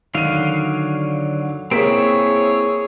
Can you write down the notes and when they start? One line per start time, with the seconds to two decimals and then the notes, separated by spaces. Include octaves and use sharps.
0.15 D3 D#3 F#3 F5 D#7
1.71 A#3 C4 E4 G#4 C#5 B6